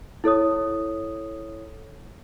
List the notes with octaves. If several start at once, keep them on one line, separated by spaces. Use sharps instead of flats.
E4 A4 C#5 D#6